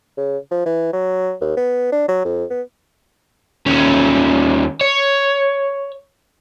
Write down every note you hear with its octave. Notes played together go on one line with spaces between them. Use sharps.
C#3
F3
E3
F#3
D#2
B3
D4
F#3
F2
B3
D#2 C#4
C#5